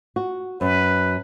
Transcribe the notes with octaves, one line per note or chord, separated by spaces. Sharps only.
F#4
F#2 B4